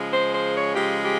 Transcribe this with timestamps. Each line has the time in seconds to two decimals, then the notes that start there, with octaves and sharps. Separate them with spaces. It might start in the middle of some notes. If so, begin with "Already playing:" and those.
Already playing: C#3 F3 G#3
0.11 C5
0.33 C5
0.54 C#5
0.74 C#3 F3 G#3 G4
1.02 G4